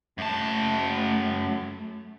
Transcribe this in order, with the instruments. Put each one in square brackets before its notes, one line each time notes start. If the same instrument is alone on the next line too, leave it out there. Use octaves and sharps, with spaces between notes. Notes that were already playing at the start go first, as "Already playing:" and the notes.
[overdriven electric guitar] F#2 A5 [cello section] A3